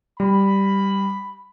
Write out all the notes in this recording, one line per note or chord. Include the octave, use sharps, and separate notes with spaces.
G3 B5